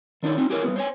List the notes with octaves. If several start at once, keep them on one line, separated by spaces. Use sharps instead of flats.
D#3 D4 D#4 C#5
C4 D#4
E4 G4 G#4 A#4 C#5
G3 A#3 B3
C5 C#5 G#5